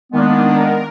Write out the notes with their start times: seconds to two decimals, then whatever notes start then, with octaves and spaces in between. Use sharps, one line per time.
0.13 D#3 G#3 A#3 B3 D4
0.57 A#4